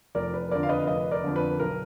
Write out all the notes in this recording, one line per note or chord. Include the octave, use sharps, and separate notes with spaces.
F1 A#4 D5
B4
F2 D3 A#4 D5
F5
B4 D#5
F1 B4 D#5
A#4 D5
F2 D3
B4
B1 A#4